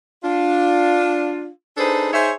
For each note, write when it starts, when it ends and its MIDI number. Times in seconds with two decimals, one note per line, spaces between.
0.23 1.48 62
0.23 1.48 65
1.77 2.13 62
1.77 2.13 63
1.77 2.13 68
1.77 2.13 69
1.77 2.13 71
1.77 2.13 72
2.13 2.32 63
2.13 2.32 68
2.13 2.32 72
2.13 2.32 73
2.13 2.32 76